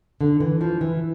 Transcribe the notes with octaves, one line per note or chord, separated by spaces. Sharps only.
D3
E3
F3
E3